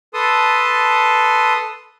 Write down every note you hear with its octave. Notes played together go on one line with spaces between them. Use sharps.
A4 B4 A5 C6 D#6